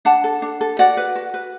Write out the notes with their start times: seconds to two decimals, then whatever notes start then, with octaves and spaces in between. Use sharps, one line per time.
0.05 D4 F#5 A5
0.24 A4
0.42 D4
0.61 A4
0.79 F#4 D5 F#5
0.97 B4
1.15 F#4
1.34 B4